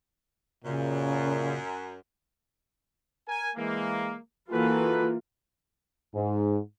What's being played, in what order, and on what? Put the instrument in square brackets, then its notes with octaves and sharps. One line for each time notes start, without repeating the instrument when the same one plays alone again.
[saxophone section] F#2 [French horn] A#2 [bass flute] C#3
[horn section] A#4 G#5
E3 G#3 A#3
[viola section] E3 A#3 F4 [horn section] F#4 A4 B4
[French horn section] G#2